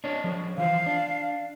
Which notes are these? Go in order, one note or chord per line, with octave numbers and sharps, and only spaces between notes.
D4 C#5 D#5
F3 G#4 C5
E3 F4 C5 F5
D4